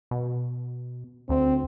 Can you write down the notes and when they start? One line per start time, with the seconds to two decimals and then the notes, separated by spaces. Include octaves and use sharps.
0.11 B2
1.29 D2 C4